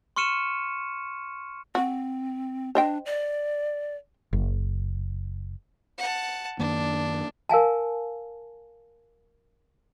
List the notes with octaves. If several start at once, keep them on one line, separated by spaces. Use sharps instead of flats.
C6 C#6 F6 C#7 D#7 E7
C4 F#4
D4 C5 D#5 G5
D5
F#1
F#5 A5
F#2 D#3 A#3 D4
A#4 F5 G#5 A5